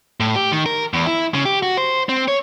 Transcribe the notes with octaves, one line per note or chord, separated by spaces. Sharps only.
A2
G4
D#3
A#4
E2
E4
C#3
G4
F#4
C5
C4
C#5